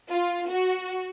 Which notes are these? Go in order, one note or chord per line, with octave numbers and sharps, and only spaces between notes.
F4
F#4